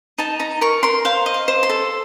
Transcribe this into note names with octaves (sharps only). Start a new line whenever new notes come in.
D#4 A5
D#4 A#5
A#4 C#6
A#4 C6
C5 F5
D#5
F5
C5
C6
A4